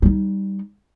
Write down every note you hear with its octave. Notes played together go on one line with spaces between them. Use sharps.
G3 D#4